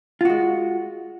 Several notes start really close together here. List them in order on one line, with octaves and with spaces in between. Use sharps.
F4 F#4 G#3